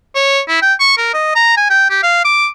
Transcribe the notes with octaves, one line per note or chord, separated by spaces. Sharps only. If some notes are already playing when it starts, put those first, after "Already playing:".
C#5
E4
G5
C#6
A#4
D#5
A#5
G#5
G5
G4
F5
D6